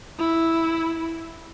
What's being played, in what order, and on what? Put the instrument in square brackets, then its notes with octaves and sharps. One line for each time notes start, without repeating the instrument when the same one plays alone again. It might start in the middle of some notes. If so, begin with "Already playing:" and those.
[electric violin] E4